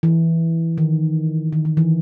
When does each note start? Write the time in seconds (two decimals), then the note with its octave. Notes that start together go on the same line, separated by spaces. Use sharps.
0.03 E3
0.78 D#3
1.53 D#3
1.65 D#3
1.77 E3